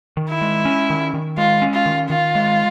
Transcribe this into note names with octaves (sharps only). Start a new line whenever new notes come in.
D#3
E4
G#3
C#4
D#3
D#3
G#3 F4
C#4
F4
D#3
D#3 F4
G#3